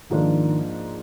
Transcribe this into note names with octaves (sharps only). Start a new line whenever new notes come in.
G#2 D#3 F3 A#3 D4